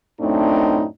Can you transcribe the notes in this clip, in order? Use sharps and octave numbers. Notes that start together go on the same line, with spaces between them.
F#2 A2 A3 C4 D4 D#4